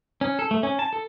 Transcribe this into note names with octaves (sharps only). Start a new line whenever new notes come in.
C#4
A4
A3
C#4
A5
A4